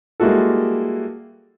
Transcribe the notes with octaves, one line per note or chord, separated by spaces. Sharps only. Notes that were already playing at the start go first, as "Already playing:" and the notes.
G3 G#3 A#3 E4 F#4 A4